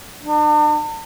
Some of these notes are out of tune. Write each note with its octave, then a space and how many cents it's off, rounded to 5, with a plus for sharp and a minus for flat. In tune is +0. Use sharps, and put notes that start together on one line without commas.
D4 +45